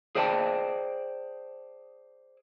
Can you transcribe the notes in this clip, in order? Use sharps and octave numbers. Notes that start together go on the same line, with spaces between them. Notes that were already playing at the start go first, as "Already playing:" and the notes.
G#4 C5 D5 G5 A5